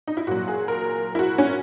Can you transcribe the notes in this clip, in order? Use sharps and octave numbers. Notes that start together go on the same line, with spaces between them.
D#4
E4
A#2 F#3 F#4
G#4
A#4
E4
F#4
C#4